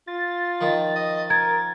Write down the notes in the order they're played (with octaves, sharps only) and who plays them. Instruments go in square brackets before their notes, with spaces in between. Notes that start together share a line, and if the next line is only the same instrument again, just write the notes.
[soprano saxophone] F4 [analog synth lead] A6
[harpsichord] D#3 F3
[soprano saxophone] D#5
[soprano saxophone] A#4 [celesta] G#6